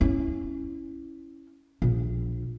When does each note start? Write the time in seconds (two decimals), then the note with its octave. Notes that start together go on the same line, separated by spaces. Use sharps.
0.01 C#4 E4
1.82 A#1